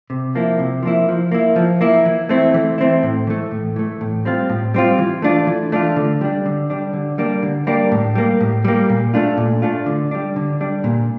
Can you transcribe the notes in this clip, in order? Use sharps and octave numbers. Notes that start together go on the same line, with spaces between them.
C3
F3 A#3 E4
C3
F3 A#3 E4
F3
A#3 E4
F3
A#3 E4
E3
A3 C4 E4
E3
A3 C4 E4
A2
E3 A3
A2
E3 A3
A2
G3 C4 F4
A2
G3 C4 F4
E3
A3 D4 F4
E3
A3 D4 F4
D3
G3 D4
D3
G3 D4
D3
G3 A#3 D4
D3
G3 A#3 D4
A2
G3 A#3
A2
G3 A#3
A#2
A3 D4 F4
A#2
A3 D4 F4
D3
G3 D4
D3
G3 D4
A#2